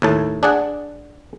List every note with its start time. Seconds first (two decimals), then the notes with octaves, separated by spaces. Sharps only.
0.02 D#2 A2 A5
0.43 D4 G#4 D5 F#5